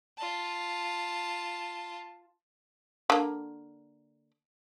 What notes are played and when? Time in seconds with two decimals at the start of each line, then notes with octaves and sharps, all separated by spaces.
0.18 F4 A5
3.10 D3 A#3